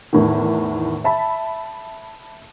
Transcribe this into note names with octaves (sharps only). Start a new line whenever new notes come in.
E2 A2 D#3
E5 A5 B5